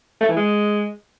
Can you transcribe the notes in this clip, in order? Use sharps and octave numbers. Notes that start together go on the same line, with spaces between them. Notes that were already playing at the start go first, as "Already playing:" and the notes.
A3
E3
G#3